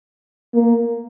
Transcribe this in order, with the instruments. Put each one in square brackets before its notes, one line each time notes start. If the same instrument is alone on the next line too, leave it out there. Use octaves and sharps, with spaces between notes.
[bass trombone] A#3